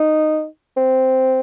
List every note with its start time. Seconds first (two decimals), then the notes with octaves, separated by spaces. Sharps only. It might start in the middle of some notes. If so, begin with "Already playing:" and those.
Already playing: D#4
0.77 C4